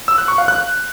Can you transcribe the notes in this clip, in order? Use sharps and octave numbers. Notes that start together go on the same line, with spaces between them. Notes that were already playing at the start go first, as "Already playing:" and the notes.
E6
F#6
C#6
F5
F#6